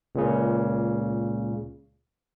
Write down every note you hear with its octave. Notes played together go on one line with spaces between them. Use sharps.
C#2 A#2 C#3